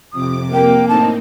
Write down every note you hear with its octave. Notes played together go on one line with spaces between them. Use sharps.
F2 C3 D6 D#6
A#3 G5
A2 C4 D#4 A5